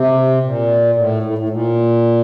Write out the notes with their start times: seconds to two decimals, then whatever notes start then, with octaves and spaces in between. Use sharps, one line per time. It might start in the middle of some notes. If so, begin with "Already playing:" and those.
Already playing: C3
0.43 A#2
0.96 A2
1.23 A2
1.38 A2
1.49 A#2